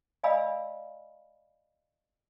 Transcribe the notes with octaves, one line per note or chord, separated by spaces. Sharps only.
D5 D#5 F5 G#5 B5 E6